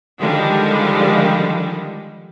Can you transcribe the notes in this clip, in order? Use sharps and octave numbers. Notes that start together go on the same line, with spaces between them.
D3 D#3 F3 G3 G#3